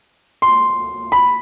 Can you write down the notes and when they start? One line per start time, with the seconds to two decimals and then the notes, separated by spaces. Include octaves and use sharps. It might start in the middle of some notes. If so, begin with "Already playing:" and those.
0.42 C6
1.12 B5